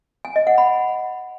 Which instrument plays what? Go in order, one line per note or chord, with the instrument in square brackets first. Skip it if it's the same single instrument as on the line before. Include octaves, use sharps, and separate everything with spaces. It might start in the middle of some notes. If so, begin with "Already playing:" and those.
[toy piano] G#5
D#5
F#5
B5